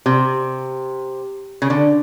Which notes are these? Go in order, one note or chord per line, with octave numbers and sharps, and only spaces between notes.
C3
C#3
D3